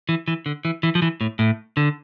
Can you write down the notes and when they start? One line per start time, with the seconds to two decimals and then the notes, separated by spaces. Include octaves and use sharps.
0.09 E3
0.28 E3
0.46 D3
0.65 E3
0.83 E3
0.95 F3
1.02 E3
1.21 A2
1.39 A2
1.77 D3